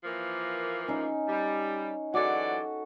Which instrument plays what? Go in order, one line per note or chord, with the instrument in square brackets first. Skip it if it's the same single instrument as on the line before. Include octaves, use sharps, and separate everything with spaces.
[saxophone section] E3 F3 A#3
[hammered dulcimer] C#4 D#4
[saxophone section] G3
[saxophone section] E3 F#3 D5 [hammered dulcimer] F#4 A4